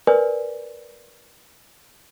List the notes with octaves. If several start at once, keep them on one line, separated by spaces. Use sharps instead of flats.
A#4 B4 D5 G#5